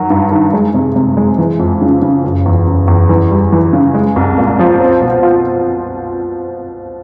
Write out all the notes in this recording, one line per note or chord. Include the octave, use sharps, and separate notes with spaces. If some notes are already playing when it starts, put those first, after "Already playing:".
Already playing: D#3 F#3
G2
D#3
G#3
C3
C3
G#3
E3
F2
C#3
C#3
F#1
E2
F#1
E2
E3
G3
E3
C#3
G#3
C2
A#2
F3
C4
B2
F4